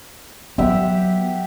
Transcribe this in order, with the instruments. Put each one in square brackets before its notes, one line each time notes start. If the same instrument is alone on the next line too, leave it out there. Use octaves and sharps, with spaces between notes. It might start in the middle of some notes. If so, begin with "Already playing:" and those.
[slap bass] F#3 B3 [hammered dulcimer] G4 E5 F#5